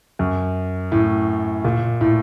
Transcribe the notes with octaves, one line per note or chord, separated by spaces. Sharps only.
F#2
A2
A#2
A2